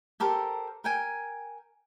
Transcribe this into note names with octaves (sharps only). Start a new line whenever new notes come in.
G4 A4 A#4 C5
A#4 G5 G#5